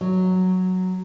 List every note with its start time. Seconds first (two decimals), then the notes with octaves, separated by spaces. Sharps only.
0.01 F#3